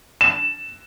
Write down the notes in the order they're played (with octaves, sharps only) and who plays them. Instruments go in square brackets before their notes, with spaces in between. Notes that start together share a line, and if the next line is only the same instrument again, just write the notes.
[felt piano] E7